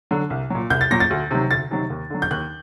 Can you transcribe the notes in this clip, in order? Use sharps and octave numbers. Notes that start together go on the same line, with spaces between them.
D3 F#3
C2
A#2 F#3
C2 G6
A6
A#2 F#3 A#6
A6
D2
C3 D#3 F#3
D2 A6
C3 D#3 F#3
D#2
D3 F#3
G6
D#2 F#6